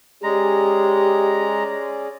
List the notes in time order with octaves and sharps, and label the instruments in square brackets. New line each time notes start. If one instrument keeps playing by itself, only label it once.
[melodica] G#3 A#5 [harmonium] C#4 G#4 D5 [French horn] G4